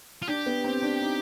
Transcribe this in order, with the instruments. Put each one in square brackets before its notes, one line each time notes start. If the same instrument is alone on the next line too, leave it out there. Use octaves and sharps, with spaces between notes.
[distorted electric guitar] F4
[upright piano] D4 [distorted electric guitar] G4
[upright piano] B3
C4
D4
D#4